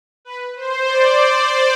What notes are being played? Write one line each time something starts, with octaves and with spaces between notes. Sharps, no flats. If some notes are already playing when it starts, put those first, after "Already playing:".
B4
C5
D5